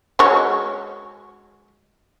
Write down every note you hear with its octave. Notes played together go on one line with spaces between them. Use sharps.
G#3 F#4 C#5